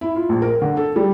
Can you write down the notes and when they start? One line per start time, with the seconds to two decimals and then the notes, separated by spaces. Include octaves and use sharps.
0.01 E4
0.16 F4
0.29 A#1
0.42 A#4
0.62 D3
0.77 A4
0.96 G3